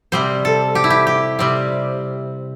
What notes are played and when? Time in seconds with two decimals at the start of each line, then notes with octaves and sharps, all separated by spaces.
0.12 C3 G3 C4 C5
0.45 A4
0.75 G4
0.84 E4
0.90 G4
1.07 G4
1.39 C3 G3 C4